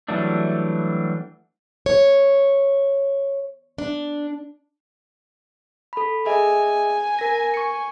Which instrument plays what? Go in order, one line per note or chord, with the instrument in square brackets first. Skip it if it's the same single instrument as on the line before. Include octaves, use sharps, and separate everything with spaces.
[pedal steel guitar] E3 F#3 G3 A3 D4
[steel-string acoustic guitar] C#5
D4
[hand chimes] A4 B5
[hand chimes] G#4 D#5 E5 [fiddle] G#5
[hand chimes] A#4 A#6
C#6 C#7